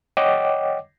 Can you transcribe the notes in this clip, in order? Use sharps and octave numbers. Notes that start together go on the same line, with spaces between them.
C#5 D#5 F#5 G5 D6